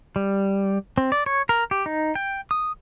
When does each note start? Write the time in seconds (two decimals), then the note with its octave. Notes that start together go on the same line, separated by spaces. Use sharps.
0.16 G3
0.98 C4
1.12 D5
1.26 C#5
1.49 A#4
1.71 G4
1.86 D#4
2.15 G5
2.51 D#6